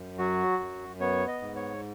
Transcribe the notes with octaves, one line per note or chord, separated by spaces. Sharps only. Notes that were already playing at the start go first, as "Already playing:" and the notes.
Already playing: F#2
F#3 F#4
F#2
B3 C#5
D#5
G#2
C#5